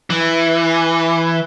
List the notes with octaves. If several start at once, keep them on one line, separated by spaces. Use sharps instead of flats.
E3